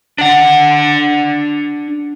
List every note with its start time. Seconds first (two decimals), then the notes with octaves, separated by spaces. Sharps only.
0.18 D4 F#5